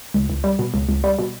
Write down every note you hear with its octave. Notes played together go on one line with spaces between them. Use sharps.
C#2
C#2
G3
B2
C#2
C#2
G3
B2